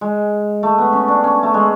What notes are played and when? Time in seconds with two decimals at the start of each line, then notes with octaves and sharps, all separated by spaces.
0.01 G#3
0.63 A3
0.78 B3
0.93 C#4
1.08 D4
1.24 C#4
1.43 A3
1.54 G#3